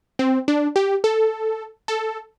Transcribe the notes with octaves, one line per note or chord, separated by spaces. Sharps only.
C4
D4
G4
A4
A4